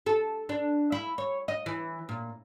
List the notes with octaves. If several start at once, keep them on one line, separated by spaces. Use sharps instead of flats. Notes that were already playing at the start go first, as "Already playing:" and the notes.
A4
D4
E4
C#5
D#5
E3
A#2